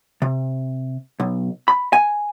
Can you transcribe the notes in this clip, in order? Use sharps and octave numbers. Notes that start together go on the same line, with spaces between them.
C3
B1
B5
G#5